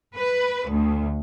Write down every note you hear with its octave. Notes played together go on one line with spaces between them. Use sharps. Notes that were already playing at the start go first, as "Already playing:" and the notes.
B4
D2